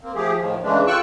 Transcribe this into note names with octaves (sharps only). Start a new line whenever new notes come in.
A#3 C4
F3 A3 G4 G#4
A2 D#3 F3
C#3 E3 G#3 A3 D4
F4 G5 C#6 E6 F#6